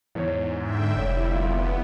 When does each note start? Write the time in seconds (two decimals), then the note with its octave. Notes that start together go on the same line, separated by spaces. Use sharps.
0.15 E2 G#2 C#5
0.61 D3 E5 G5
0.96 F1 G3 E4 C#5
1.31 B3 E4 F4